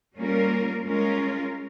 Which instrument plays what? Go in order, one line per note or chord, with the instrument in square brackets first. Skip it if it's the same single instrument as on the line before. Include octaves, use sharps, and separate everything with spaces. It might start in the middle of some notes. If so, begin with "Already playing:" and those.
[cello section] G3 A#3 C#4 F4 A#4
G#3 C#4 F4 A#4